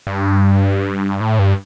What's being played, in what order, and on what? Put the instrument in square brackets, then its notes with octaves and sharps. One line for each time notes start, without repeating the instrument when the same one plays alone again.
[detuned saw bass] G2
A2
G2